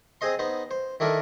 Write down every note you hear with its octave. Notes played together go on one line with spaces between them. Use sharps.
C4 G#4 C5 D#5 C6
B3 D#4 C5
C5
D#3 D4 E4 A4 A#4